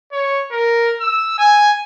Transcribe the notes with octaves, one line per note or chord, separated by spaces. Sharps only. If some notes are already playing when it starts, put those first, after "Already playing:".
C#5
A#4
E6
G#5